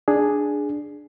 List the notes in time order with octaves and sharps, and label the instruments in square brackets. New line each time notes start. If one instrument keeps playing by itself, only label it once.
[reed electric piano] D4 G#4